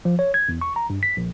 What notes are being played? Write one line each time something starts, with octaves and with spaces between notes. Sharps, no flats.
F3
C#5
G#6
E2
C#6
A#5
G2
B6
A#1